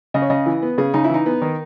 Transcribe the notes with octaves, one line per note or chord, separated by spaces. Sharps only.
C#3 D#5
C#5
C#3 D#5
E3
B3
C#3 G#4
C#3 D#4
E4
E3 D#4
B3
D#3